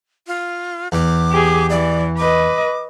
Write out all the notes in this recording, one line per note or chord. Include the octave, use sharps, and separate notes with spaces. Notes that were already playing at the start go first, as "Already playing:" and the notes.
F4
E2 D6
G4 G#4
E3 D5
B4 D#5 D6